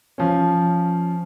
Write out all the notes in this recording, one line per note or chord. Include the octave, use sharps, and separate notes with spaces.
F3 C#4